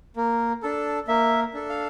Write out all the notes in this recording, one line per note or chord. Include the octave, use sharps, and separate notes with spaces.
A#3
D4 A4
A#3 E5
D4 A4
F5